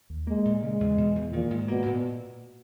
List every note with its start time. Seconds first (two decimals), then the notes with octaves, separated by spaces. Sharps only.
0.10 D#2
0.27 G#3 A#3
0.45 A#2
0.63 C#3 G#3
0.80 E2
0.98 B2
1.15 E2
1.33 A#2 D#3
1.51 G#2
1.68 B2 A#3
1.86 A#2